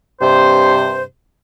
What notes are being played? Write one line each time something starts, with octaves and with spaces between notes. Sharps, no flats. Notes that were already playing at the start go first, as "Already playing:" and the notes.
G2 C3 C5